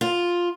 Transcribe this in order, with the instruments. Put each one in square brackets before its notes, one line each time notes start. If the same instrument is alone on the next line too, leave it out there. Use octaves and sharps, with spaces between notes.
[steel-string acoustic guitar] F4